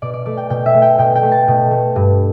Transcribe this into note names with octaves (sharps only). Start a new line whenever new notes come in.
B2 D5
D5
A3 D5
G5
B2 G5
E5
A3
G5
B2 G5
G5
A3
A5
B2
A3
G2